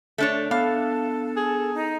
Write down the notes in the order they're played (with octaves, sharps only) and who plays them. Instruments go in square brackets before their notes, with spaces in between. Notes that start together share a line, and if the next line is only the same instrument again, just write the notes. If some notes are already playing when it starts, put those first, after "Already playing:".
[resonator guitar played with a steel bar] A3 D4 C#5
[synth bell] B3 D4 [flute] A4 [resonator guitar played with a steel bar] F5
[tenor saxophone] G#4
[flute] D#4